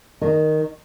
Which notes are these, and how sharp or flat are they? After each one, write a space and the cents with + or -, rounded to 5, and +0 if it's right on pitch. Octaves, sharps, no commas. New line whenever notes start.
D#3 +0 D#5 -20